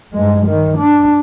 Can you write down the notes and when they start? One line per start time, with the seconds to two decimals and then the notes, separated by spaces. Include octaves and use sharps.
0.14 G2 G#3
0.47 D#3
0.77 D4